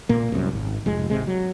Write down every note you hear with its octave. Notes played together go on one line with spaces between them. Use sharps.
A#2 A#3
C2 F#2
G#1
F1 G#3
G#1 C3 G#3
F#3